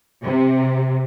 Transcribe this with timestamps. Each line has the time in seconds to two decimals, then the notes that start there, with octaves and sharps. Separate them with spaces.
0.23 C3